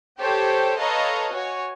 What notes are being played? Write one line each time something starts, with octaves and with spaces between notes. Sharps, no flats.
G4 A4 C5 C#5 G5
A4 B4 C#5 D#5 F5 A#5
F#4 C#5 G#5